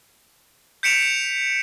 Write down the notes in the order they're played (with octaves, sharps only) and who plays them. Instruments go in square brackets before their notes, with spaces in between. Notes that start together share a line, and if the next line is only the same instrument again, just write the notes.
[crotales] G6 B6 C#7 D7 E7 F7